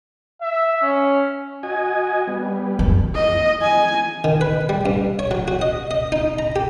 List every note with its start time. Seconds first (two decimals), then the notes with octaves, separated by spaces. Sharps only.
0.42 E5
0.81 C#4
1.63 F#4 D#5 G#5
2.28 G3 B3
2.79 F#2
3.15 D#5
3.61 G#5
4.24 D#3
4.41 B4
4.69 G3
4.86 G2
5.19 C#5
5.31 F#3
5.48 F#4
5.62 D#5
5.91 D#5
6.12 D#4
6.39 A#5
6.56 G4